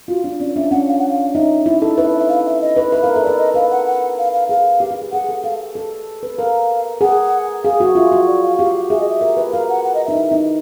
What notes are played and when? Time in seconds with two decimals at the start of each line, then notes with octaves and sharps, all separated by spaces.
0.08 F4 F#4
0.24 D4
0.40 C#4 D5
0.56 D4 E5
0.71 C#4 F#5
0.88 F5
0.99 F#5
1.09 F5
1.34 D#4 E5
1.66 E4
1.82 A4
1.97 B4 E5
2.08 E5
2.19 E5
2.29 F5
2.45 E5
2.61 D#5
2.77 B4
2.92 B4 E5
3.02 A#4 F5
3.13 E5
3.16 A4
3.23 A#4 D5
3.39 D#5
3.54 B4 F5
3.71 F#5
3.87 F#5
4.18 F5
4.33 F5
4.49 G#4 F5
4.80 G4
4.91 G4
5.02 G#4
5.12 G#4 F#5
5.29 A4
5.44 A4 F5
5.75 A4
6.23 B4
6.39 A#4 F5
7.01 G#4 F#5
7.64 G#4 F5
7.80 F#4
7.95 F4 E5
8.12 F#4
8.28 D5
8.42 F5
8.58 G4 F5
8.90 G#4 E5
9.00 D#5
9.09 E5
9.21 A#4
9.37 B4
9.53 A#4 F5
9.69 F#5
9.84 F#5
9.95 D#5
10.05 D#4 E5
10.16 E4
10.32 D#4